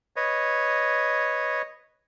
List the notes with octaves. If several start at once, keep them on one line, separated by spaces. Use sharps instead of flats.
B4 C#5 D#5